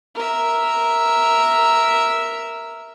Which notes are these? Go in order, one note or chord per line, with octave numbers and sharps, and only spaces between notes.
A#4 E5